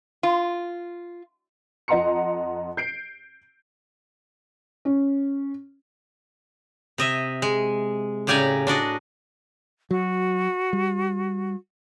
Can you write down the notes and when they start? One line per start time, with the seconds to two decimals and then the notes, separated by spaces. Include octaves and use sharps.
0.23 F4
1.88 F2 D#5 F#5 A#5 C6 C#7
2.77 G6 C7 D7
4.85 C#4
6.98 C3 D#5 E5
7.42 G#3
8.27 A2 C#3 G4 D5 G#5 A#5
8.67 D4 F#4 D5 D#5
9.91 F#3 F#4
10.73 G3